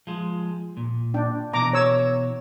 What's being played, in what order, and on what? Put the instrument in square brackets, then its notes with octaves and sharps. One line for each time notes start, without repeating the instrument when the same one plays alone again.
[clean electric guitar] F3 G#3
A#2
[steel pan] D4 G5
[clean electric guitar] B2 E3 [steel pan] A#5 D6
[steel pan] C#5 E6